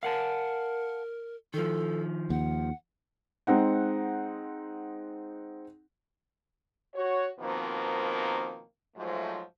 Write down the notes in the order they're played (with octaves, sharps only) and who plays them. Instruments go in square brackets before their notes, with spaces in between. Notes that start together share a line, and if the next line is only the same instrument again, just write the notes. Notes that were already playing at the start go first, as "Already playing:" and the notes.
[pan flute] A#4 [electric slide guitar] F5 F#5 A5
[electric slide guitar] D#3 F3 [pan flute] A4
[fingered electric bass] D#2 [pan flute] F#5
[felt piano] G#3 C4 D#4 F#5
[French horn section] F#4 C#5
B2 D#3 F3 A#3 C4
G#2 F3 F#3 A3